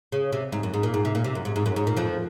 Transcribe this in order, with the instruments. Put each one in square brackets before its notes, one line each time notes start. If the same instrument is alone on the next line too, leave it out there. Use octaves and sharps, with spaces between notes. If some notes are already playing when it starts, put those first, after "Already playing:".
[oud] C#3
C3
G#2
F#2
G#2
A#2
G#2
C3
A#2
C3
F#2
G#2
G#2
F#2
G#2
A#2
F2 F3